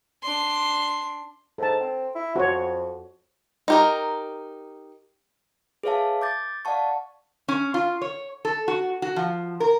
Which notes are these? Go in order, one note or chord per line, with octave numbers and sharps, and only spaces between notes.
D4 C6
G#2 A4 A5
C4
E4
F2 F#4 C5 C#5
D#4 G4 A#4
G#4 B4 C#5 E5 F5 A5
D6 G6 A6
D5 F5 F#5 A5 C#6
C#4
F4
C#5
A4
F#4
F#4
F3
A#4